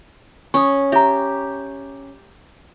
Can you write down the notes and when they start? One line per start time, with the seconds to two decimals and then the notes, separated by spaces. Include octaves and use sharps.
0.54 C#4 C#6 D#6
0.92 G4 E5 A#5